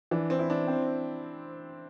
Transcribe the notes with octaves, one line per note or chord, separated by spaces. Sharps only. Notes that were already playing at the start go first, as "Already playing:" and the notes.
E3 D4
C4
E4
D4
C4